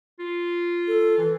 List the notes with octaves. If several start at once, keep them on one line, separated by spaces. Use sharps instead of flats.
F4
A4
E3